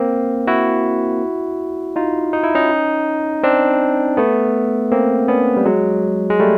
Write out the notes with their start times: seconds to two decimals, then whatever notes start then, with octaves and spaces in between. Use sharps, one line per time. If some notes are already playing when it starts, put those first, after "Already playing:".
Already playing: A#3 C4
0.47 E4 F#4
1.96 D#4 F4
2.33 D#4
2.44 E4
2.55 C#4 D#4
3.43 C4 D4
4.17 A3 B3
4.91 A#3 C4
5.28 B3 C#4
5.57 G3
5.65 F#3 G#3
6.30 G#3
6.39 G3 A3